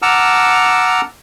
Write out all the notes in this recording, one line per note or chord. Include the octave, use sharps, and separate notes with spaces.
F#5 A5 A#5 D6 E6 F6